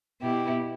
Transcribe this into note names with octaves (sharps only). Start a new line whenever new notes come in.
B2 E4 G4